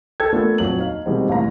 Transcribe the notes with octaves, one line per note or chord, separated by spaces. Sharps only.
A4 B4 G5 G#6
A3 B3 D4 F4 A4 A#4
D#1 F2 F#3 F#7
D#4 F5
B2 D#3 G3 G#3 C4
A1 D#2 A#5